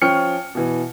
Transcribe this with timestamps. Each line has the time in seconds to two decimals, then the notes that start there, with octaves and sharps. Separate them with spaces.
0.02 F3 C#4 G5 C#6 F6 C#7
0.55 B2 E3